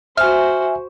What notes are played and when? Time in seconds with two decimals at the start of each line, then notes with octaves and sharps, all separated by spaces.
0.17 F#4 C5 E5 G#5 F6